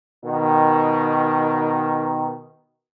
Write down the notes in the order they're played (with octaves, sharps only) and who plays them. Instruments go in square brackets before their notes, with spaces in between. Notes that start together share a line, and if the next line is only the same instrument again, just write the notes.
[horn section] B2 D#3